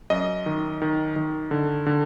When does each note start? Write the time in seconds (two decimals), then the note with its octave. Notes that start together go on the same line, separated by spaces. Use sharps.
0.10 F#2 D#5
0.46 D#3
0.82 D#3
1.16 D#3
1.51 D3
1.86 D3